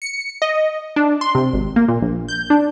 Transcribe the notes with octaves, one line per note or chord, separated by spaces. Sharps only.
C#7
D#5
D4
C6
C3
G#1
A#3
A#2
A#1
G6
D4